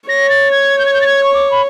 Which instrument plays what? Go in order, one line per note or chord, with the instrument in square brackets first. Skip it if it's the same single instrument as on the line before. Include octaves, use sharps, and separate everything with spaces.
[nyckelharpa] C#5 [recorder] A#6
[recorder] A6
G#6
G6
G#6
G6
A6
G#6
C#6
D6
B5